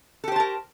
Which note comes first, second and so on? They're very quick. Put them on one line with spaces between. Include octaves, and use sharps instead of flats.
A4 G4 C5 A5 A#4